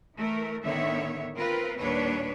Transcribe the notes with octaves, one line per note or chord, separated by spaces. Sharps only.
E3 A3 A#4
A2 D3 D#3 B3 C#5 E5
C4 F4 A#4 B4
D#2 A#2 G3 D4 B4 C#5